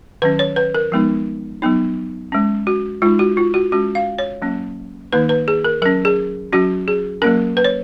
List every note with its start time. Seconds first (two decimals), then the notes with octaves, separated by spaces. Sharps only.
0.22 D#3 F#3 C#4 B4
0.39 C#5
0.56 B4
0.75 A#4
0.92 F3 G#3 B3 D#4
1.62 F#3 B3 D#4
2.32 G#3 C#4
2.67 F#4
3.02 G#3 D#4 F4
3.19 F#4
3.37 F4
3.54 F#4
3.72 G#3 C#4 F#4
3.95 F5
4.19 C#5
4.42 F#3 A#3 C#4
5.13 D#3 A#3 D#4 B4
5.29 B4
5.48 G#4
5.65 A#4
5.82 F#3 C#4 A#4
6.05 G#4
6.52 F#3 C#4 F#4
6.88 G#4
7.22 F#3 A#3 C#4 A#4
7.57 B4
7.64 C#5